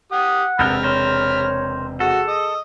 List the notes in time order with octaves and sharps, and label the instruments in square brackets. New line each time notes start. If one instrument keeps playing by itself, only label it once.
[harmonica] G4 D#6 [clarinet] F#5
[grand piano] E1 C3 G6 [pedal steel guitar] B3 A4 A#4 [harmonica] B5 F6
[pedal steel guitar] A#4 C5 [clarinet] C#5
[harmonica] F#4 F#5 [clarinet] G#4 [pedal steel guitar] A4
[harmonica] D#5